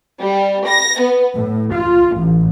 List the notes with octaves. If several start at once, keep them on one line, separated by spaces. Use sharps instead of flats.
G3
A#6
B3
A2
F4
A1